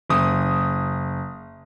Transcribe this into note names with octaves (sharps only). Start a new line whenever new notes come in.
F#1 D#6